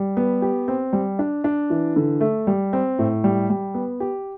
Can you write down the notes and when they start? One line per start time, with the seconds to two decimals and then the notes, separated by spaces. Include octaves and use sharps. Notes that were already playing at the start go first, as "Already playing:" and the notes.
Already playing: G3
0.17 B3
0.42 G4
0.68 C4
0.93 G3
1.19 D4
1.44 D4
1.70 E3
1.96 D3
2.21 A3
2.47 G3
2.73 C4
2.99 A2
3.24 G3
3.50 G3
3.74 B3
4.00 G4